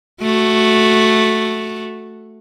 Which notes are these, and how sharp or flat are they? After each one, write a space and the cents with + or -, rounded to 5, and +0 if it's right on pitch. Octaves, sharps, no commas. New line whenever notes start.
A3 +0 F#4 +0